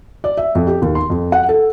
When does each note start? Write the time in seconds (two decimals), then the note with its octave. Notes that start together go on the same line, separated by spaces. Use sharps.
0.24 D5
0.37 E5
0.55 F2
0.67 G4
0.82 D#2
0.95 C6
1.10 F2
1.32 F#5
1.49 A4